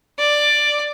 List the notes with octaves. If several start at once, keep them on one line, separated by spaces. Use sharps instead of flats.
D5